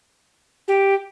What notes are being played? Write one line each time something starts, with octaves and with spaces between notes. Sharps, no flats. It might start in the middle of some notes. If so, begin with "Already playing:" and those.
G4